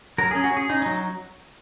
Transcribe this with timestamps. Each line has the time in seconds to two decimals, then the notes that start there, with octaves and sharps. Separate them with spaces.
0.18 F#3 A#4
0.31 C#4 G#4
0.44 F#4
0.52 C#4 G#4
0.69 C#4 D#4
0.82 F#3 D#4